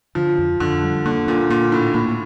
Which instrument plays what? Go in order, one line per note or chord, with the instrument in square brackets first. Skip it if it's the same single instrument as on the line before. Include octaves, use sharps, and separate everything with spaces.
[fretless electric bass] D3 [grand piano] F3
[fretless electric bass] F2
[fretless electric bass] F2 [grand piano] D3
[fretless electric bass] G3
[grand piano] D3 [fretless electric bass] A#3
[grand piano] A#2 [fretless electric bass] D4
[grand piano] A#2 [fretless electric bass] A#3
[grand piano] A2 [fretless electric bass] D4
[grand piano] A2 [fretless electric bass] A#3